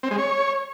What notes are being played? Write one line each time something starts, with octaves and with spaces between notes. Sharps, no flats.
C4
G#3
C#5